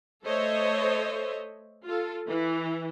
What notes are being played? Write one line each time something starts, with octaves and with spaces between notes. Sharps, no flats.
A3 A4 C5 C#5 D#5 E5
F4 A4
E3